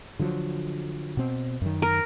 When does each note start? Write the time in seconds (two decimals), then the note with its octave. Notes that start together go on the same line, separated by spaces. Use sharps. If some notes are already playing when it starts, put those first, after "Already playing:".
0.19 D3 F3 F#3
1.17 B2 C4
1.62 F#2 D#3
1.82 A#4